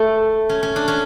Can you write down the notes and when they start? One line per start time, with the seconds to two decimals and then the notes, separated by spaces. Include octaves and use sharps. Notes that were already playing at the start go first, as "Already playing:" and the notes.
Already playing: A3
0.49 C#4
0.63 C#4
0.76 D4
0.88 C#4